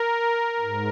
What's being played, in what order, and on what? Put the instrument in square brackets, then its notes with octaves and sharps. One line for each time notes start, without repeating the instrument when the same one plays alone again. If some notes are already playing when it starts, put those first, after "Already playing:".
Already playing: [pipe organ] A#4
G#2